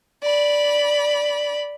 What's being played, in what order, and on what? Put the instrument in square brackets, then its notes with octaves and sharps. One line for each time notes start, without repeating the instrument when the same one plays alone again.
[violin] D5 B5